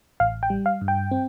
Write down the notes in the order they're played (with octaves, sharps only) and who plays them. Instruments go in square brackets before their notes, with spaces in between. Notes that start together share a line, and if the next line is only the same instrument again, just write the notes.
[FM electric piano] A1 F5
G5
G3
F5
G2
G5
C4